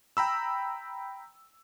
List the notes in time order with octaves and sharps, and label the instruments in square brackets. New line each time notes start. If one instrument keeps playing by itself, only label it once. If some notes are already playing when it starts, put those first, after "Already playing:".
[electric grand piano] G5 A#5 B5 E6